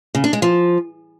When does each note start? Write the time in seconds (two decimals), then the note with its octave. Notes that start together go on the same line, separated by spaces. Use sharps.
0.15 C#3
0.24 D4
0.33 G#3
0.42 F3